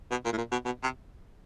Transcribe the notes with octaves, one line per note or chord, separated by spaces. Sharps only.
B2
A#2
A2
A#2
B2
B2
C3